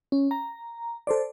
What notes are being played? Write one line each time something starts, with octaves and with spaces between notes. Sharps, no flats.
C#4
A#5
A4 C5 D5